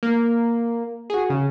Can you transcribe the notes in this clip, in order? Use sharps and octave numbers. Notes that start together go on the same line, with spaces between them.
A#3
F#4 G#4
C#3